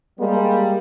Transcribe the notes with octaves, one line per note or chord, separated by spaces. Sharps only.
G3 G#3 A#3